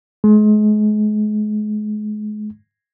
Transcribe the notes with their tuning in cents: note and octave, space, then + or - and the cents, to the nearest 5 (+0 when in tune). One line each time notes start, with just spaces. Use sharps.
G#3 +35